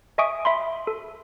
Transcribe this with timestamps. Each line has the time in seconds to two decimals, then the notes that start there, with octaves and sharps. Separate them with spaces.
0.18 D#5 E5 G#5 C#6 D#6 D7
0.45 E5 B5 C6
0.87 A4